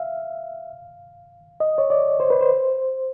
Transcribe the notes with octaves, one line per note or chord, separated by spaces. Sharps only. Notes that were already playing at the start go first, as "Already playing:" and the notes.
Already playing: E5 F5
D#5
C#5
D5
C5
B4
C5